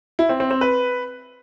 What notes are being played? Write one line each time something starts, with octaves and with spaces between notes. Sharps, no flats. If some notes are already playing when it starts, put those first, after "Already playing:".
E4
C4
C4
C4
B4